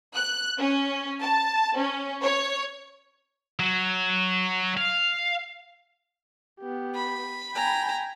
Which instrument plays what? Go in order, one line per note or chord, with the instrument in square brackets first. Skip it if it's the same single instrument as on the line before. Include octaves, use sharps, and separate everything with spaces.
[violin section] F#6
C#4
A5
C#4
C#5
[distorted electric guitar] F#3
F5
[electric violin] B3 G4
[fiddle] B5
[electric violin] G5 G#5 [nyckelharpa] A#5